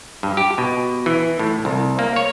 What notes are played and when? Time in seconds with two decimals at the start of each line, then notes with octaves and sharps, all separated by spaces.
0.23 G2
0.37 G4
0.58 B2
1.06 E3
1.39 A2
1.65 C2
1.99 A#3
2.16 C#5